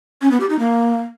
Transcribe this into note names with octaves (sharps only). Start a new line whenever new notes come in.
C#4
B3
G4
D#4
A#3